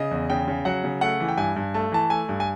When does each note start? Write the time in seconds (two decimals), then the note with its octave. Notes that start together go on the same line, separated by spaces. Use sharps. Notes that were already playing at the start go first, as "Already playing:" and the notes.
Already playing: C#3 D#5
0.11 E2
0.30 C#3 G5
0.48 C#3
0.65 F#3 F#5
0.84 C#3
1.01 A3 F#5
1.20 E3
1.28 G5
1.38 G2 G#5
1.56 G2
1.74 A3 A5
1.92 E3 A5
2.10 A3 G#5
2.29 G2
2.40 G#5